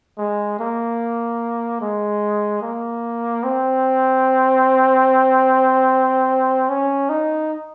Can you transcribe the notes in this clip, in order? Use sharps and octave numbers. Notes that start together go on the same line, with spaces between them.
G#3
A#3
G#3
A#3
C4
C#4
D#4